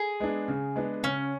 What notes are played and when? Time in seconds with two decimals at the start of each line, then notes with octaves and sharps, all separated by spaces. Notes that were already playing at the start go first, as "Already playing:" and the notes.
Already playing: G#4
0.20 G#3 B3 D4
0.48 C#3
0.76 G#3 B3 D4
1.03 C#3 C#4